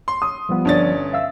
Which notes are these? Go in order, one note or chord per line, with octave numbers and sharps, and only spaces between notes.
C6
D#6
F3 G3 B3
G1 C#4 D4 D5 A6
E5 F5 E6